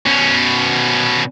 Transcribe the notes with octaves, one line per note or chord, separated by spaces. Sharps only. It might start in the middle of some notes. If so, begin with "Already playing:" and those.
B2 C#4